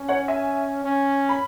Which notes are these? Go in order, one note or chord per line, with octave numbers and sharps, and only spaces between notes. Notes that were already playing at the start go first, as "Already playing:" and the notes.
Already playing: C#4
C#5 F#5
E5 G#5
C#4
B5